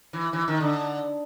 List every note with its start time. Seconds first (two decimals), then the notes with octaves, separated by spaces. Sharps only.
0.13 E3
0.33 E3
0.48 D#3
0.61 D3